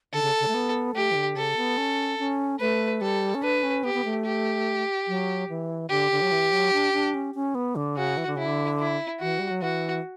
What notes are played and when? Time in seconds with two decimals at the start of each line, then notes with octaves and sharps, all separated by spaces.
0.13 D3 A4
0.22 C#3
0.40 C#3
0.48 A3
0.54 B3
0.95 A3 G4
1.11 E3
1.15 D3
1.36 C#3 A4
1.57 B3
1.78 C#4
2.19 C#4
2.60 A3 B4
3.01 G3 A4
3.35 C#4
3.43 D4 B4
3.63 C#4
3.84 B3 G4
3.94 B3
4.05 A3
4.25 G4
5.08 F#3
5.49 E3
5.90 D3 G4
6.12 D3
6.22 F#3
6.32 E3
6.52 F#3
6.73 D4
6.93 D4
7.14 C#4
7.35 C#4
7.55 B3
7.76 D3
7.96 C#3 F#4
8.17 E3
8.27 D3
8.36 C#3 E4
8.45 D3
8.79 E4
9.20 E3 F#4
9.39 G3
9.51 F#3
9.61 E3 F#4